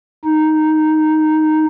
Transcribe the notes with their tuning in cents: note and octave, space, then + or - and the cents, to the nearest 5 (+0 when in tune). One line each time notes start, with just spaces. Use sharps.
D#4 +0